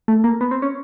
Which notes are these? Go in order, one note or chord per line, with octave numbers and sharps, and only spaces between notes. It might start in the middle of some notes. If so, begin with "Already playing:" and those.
A3
A#3
B3
C4
C#4